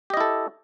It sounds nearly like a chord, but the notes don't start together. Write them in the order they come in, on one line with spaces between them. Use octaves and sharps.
G4 D#5 E4 A4